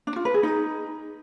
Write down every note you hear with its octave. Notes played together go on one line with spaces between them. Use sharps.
D4
F4
B4
G#4
D#4